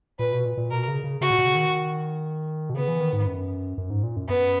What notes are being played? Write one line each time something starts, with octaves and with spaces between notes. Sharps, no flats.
A#2 B4
B2
A#2
A#2
B2 A#4
C#3
C#3
C#3 F#4
A#2
B2
C#3
D#3
B2
C#3 B3
E3
D#3
G#2
F#2
F#2
G#2
A#2
F#2
F#2 B3